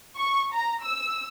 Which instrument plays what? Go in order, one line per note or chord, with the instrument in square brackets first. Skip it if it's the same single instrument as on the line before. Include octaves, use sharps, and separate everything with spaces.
[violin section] C#6
A#5
E6